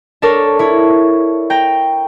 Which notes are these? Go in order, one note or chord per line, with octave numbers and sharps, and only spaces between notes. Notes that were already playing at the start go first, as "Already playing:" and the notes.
D4 A4 A#4 C#5
E4 C#5
G5 A#5